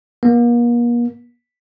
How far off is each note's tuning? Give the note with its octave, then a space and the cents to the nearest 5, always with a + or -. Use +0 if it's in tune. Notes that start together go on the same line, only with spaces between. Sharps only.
A#3 +40